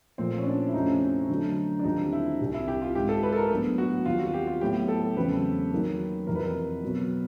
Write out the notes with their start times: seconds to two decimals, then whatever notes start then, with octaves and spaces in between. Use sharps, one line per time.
0.18 A#2 F3 A3 C4
0.38 C#4
0.47 D4
0.69 E4
0.74 F2 C3 F3 A3 C#4 D#4
1.29 D3 F#3 A3
1.79 D4
1.84 D#2 D3 G3 C4 D#4 F4
2.12 E4
2.40 C2 C3 D#3
2.54 E4
2.68 G4
2.82 F4
2.95 G#2 D#3 G#3 G4
3.09 A4
3.23 B4
3.32 A4
3.36 A#4
3.50 A2 F#3 B3 D4
3.78 F#4
4.05 D#2 D#3 G3 C4 F4
4.19 F#4
4.34 G4
4.47 F4
4.61 A2 F#3 B3 G4
4.88 A4
5.16 E2 C#3 F#3 A3 C4 B4
5.72 D#3 F#3 A#3 D#4 G#4
6.27 F2 C3 E3 A#4
6.35 B4
6.44 A#4
6.83 B2 F#3 B3